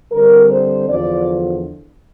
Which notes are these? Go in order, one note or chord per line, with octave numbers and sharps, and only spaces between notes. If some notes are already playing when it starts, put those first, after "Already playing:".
D3 G3 C4 A#4
C5
E2 D3 F3 D5